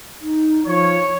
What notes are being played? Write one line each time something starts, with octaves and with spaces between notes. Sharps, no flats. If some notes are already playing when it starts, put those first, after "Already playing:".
D#4
F3 C#5